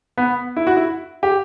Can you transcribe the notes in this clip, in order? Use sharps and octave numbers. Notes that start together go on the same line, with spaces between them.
B3
E4
F#4
E4
G4